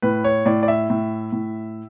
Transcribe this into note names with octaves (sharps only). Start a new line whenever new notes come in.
A2 B4
C#5
A2 D5
D5
E5
A2
A2